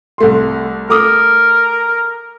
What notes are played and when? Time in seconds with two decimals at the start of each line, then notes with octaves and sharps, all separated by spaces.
0.18 C2 A3 C6
0.90 A3 A#4 D6 D#6